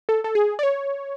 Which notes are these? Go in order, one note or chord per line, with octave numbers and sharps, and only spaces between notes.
A4
A4
G#4
D5
C#5